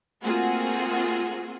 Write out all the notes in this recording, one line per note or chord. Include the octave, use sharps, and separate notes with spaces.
A3 A#3 C4 F4 F#4 G#4